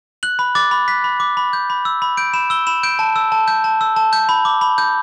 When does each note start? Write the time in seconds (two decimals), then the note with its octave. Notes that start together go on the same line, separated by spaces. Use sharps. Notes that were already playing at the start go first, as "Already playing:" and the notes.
0.23 F#6 F#7
0.39 B5
0.55 D6 A6
0.71 B5
0.88 F#6 B6
1.04 B5
1.20 D6
1.37 B5
1.53 G6
1.70 B5
1.85 E6
2.02 B5
2.17 G6 D7
2.34 B5 E7
2.50 E6 G7
2.67 B5 E7
2.83 G6 D7
2.99 A5
3.16 E6
3.32 A5
3.48 G6
3.64 A5
3.81 E6
3.96 A5
4.13 G6
4.29 B5
4.45 D6
4.61 B5
4.78 G6